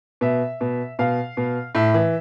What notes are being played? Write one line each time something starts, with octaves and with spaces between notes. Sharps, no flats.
B2 E5
B2
B2 F5
B2
A2 E5
E3